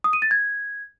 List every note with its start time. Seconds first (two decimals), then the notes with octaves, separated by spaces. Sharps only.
0.04 D#6
0.13 D#7
0.22 A6
0.31 G#6